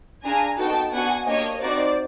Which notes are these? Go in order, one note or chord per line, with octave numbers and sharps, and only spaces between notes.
D4 F4 G#4 G#5 A#5
B3 D#4 F#4 A4 G5 A5
B3 D4 F#4 F#5 G#5
A#3 D4 G4 C#5 D#5
C4 D#4 F#4 C5 D5